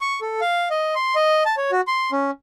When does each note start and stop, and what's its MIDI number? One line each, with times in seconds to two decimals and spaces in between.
0.01 0.20 85
0.21 0.41 69
0.41 0.69 77
0.70 0.95 75
0.95 1.15 84
1.15 1.43 75
1.45 1.55 81
1.57 1.71 73
1.71 1.81 66
1.87 2.11 84
2.12 2.31 61